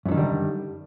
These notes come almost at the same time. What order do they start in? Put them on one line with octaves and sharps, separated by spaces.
F#2 F#3 D#3 D3 G3